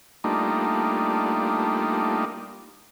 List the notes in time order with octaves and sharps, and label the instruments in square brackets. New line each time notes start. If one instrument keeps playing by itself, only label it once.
[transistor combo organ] G3 A3 A#3 D4 D#4 F4